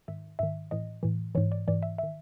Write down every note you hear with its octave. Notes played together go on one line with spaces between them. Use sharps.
G#2 D#3 E5
G#2 D#3 E5
A2 E3 D#5
A2 E3
G#2 E3 C#5
D5
G#2 E3 D5
E5
E5
D#3